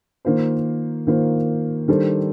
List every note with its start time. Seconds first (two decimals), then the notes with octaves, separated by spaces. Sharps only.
0.25 D#3 A#3 F4 C5
1.07 D#3 A#3 F4 C5
1.88 D#3 G3 D4 A4 C5